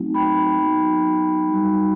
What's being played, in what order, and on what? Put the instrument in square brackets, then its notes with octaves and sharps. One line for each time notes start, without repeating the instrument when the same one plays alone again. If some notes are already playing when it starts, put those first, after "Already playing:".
Already playing: [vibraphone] F#3 A3 C4 D#4 F#4
G5 B5
F#3 B3 D#4 F#4
G3 D#4 F#4